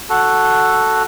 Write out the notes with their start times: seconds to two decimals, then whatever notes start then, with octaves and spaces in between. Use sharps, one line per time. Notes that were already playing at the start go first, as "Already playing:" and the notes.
0.09 F#4 A4